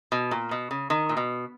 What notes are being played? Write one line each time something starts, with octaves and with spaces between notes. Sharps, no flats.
B2
A#2
B2
C#3
D#3
A#2
B2